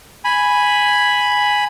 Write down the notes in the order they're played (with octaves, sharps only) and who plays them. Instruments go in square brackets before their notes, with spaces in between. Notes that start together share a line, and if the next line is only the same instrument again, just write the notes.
[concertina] G#5 B5